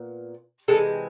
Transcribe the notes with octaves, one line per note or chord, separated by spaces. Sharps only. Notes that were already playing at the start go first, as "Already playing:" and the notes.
Already playing: A#2 B3
C3 E3 G#3 A4